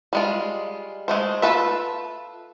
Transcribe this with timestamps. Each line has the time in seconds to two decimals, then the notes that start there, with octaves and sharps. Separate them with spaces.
0.13 G3 G#3 F4
1.08 G#3 A3 C5
1.42 F4 F#4 A4 B4 E5